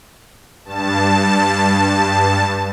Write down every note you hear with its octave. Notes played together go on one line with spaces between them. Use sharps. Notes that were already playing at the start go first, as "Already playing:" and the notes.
G2 A5